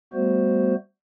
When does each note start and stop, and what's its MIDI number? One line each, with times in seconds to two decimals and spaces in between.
0.14 0.75 55
0.14 0.75 57
0.14 0.75 59
0.14 0.75 66
0.14 0.75 72